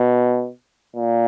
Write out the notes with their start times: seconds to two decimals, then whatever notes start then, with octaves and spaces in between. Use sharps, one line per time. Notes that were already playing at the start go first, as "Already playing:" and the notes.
Already playing: B2
0.96 A#2